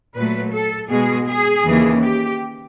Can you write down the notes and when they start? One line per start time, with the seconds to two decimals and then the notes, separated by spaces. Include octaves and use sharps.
0.15 A#2 F#3 A3 B4
0.52 A4
0.89 B2 G#3 G#4
1.26 G#4
1.64 D#2 C#3 E3
2.01 G4